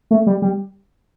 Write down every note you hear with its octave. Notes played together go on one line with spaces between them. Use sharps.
A3
G3
G3